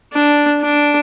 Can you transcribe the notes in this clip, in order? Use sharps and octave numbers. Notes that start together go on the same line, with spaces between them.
D4
D4